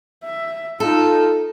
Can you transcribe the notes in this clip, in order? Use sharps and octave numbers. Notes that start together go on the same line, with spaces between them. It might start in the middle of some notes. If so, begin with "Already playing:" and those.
E5
D#4 F4 A4